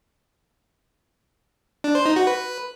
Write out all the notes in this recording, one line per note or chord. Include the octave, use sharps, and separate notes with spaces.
D4
C5
D#4
F#4
B4